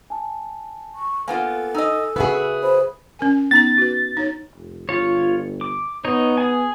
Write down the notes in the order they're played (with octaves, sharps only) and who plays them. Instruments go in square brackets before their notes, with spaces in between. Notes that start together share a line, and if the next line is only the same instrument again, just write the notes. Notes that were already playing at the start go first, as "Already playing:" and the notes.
[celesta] G#5 A5
[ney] C#6
[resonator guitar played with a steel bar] A#3 B3 F4 [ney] A4 [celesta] G#5
[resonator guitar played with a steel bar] D#4 D#5 [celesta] G#5 E6
[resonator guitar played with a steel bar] C#3 F#4 E5 [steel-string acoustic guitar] G#4 B4
[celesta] C5 [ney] B5
[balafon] C#4 A#4 G#5
[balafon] B3 D#4 A#5 [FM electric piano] A6
[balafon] F#4 B4
D#4 C#5
[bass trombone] F1
[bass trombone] G1 [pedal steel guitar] F4 C#5
[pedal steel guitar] D6
[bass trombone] B3 [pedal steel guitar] D#4 C#5 D#5
[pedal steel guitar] G#4 G#5